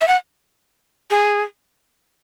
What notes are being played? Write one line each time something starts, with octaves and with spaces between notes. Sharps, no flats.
E5
F#5
G#4